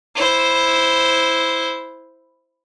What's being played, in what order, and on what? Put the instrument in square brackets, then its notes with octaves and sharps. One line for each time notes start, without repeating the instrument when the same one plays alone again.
[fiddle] E4 C5